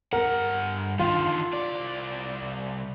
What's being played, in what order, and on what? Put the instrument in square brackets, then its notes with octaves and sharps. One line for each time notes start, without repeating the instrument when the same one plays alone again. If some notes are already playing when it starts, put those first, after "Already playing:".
[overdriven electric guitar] G2 F#5 [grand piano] A#4
[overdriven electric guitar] D3 D#3 [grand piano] F4
[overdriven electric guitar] C2 D5